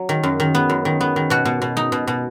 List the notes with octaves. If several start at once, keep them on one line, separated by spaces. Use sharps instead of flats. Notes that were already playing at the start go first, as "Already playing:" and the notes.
Already playing: F#3
D#3
F#2
D#3
B3
F#2
D#3
B3
D#3
B2 F#4
B2
B2
D#4
B2
B2